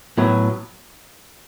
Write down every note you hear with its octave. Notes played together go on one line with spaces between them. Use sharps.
A2 F#3 B3